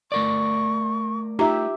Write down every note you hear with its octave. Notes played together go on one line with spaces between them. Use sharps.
A3 A#4 D5 C#6
D#4 F4 G4 E5 A#5